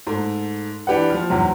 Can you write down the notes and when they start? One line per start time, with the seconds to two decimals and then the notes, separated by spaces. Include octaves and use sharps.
0.07 G#2 A3
0.87 E3 D4 G4 B4 F#5
1.10 F3 F6
1.30 E2 G#2 C3 F#3